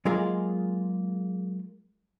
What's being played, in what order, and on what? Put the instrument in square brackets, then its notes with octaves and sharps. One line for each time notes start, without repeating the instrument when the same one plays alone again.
[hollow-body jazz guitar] F#3 G#3 A#3 F4 G#4 D#5